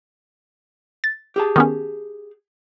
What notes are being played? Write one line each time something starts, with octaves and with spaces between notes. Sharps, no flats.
A6
G4 G#4 A5
D#3 B3 C#4